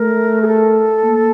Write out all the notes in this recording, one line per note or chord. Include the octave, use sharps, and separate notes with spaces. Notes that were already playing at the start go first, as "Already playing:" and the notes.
Already playing: A3 A#4
G#4
A4
A#3